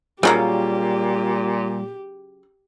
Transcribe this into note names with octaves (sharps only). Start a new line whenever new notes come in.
A#2 C#3 F#3 G3 A#3 F4 G4